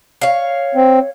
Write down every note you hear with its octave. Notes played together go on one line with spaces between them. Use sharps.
C#5 F5
C4